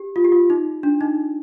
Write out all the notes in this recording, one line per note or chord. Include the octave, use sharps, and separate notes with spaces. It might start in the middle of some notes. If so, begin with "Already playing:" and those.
Already playing: G4
F4
G4
F4
D#4
D4
D#4